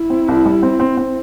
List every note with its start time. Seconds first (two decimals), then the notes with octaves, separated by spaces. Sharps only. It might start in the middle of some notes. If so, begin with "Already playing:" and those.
Already playing: E4
0.10 C4
0.28 C2
0.46 G3
0.63 C4
0.80 C4
0.97 C4